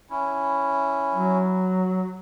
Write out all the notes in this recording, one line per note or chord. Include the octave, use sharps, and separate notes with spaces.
C#4 E4
F#3